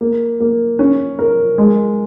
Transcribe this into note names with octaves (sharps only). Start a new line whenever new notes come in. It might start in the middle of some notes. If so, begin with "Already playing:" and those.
A#3
A#3
C#4
A#4
G#3